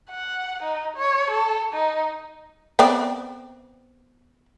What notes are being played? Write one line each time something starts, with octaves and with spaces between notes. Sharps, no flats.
F#5
D#4
C#5
A4
D#4
B3 C4 D5